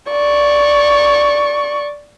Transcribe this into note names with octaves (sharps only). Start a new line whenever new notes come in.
D5 C#6